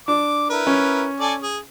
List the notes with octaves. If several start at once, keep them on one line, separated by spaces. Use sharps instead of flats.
D4 D6
E4 A#4 B4
C#4
A4 D5 G#5
G#4